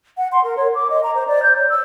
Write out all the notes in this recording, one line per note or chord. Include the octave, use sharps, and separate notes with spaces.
F#5
C6
A#4
C#5
D6
D#5
A#5
C5
D5
G6
C#5
E6